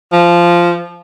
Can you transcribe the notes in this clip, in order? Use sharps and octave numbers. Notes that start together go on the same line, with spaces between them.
F3